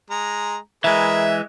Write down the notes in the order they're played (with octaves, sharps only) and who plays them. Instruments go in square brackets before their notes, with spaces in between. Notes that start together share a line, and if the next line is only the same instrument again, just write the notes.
[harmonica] G#3 A#5
[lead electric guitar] E3 G#3 [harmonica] G#4 A#4 B4 [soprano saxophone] E5